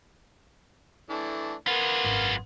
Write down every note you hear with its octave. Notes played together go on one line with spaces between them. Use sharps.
E3 A3 D4
A#3 F4 G#4 B4 F#5
G#1 F#2